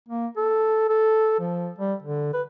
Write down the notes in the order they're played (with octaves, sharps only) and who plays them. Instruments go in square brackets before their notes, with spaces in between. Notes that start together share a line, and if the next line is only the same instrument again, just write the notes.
[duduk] A#3
A4
A4
F3
G3
D3
B4